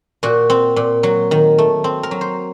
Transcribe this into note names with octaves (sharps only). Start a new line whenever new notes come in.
A#2 F#4
C4
A#2
F#3
D#3
A3
C4
A#4
F#3
C5